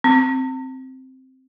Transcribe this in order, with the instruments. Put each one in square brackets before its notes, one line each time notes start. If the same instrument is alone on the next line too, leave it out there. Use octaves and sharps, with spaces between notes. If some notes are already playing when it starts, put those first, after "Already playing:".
[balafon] C4